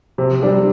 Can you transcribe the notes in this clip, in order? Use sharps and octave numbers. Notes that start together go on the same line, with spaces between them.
C3
G3 D4 G4